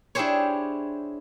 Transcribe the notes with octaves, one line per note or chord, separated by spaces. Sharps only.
D4 E4 G4 G#4 C5 C#5